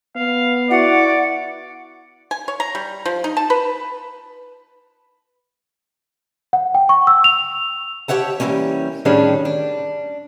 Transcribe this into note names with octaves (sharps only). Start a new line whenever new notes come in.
B3 F5
E4 F#4 D5 F#5
G#5
C#5
A#5
G3
F3
D#4
A5
B4
F#5
G5
C#6
E6
F7
G4 C#5 E5 F#5 A5
E3 G3 G#3 A#3 C#4
A2 D#3 G3 C#4 D4 G#4
D4